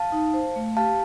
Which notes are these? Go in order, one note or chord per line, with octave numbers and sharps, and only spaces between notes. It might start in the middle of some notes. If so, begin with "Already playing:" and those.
Already playing: F5 A5
D#4
C5
A3
G4 F5 A5